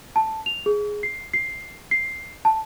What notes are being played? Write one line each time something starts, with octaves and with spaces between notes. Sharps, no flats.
A5
F7
G#4
C7
C7
C7
A5